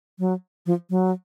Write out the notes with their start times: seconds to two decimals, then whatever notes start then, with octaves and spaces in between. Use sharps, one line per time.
0.19 F#3
0.66 F3
0.90 F#3